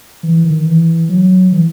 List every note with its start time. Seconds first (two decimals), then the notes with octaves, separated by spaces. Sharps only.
0.23 E3
0.44 D#3
0.66 E3
1.09 F#3
1.52 E3